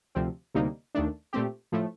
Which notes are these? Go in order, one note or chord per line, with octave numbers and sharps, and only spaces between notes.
D2 C3 F3 C4
D2 C3 G3 A#3 D#4
D#2 D#3 A3 D4
A#2 A3 C4 G4
A2 F3 A3